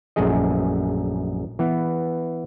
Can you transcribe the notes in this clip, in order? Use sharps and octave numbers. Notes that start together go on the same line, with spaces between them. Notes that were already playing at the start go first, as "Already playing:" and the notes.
A#1 F#2 A3 G#4 D#5
E3 B3